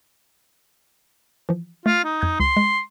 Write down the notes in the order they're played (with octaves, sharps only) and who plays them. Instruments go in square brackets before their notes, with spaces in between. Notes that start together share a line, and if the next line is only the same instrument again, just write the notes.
[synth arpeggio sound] E3 F3
[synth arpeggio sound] A3 [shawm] F4
[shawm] D#4
[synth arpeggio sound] F2 G6 G#6
[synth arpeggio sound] C#2 [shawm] C6
[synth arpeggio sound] G#3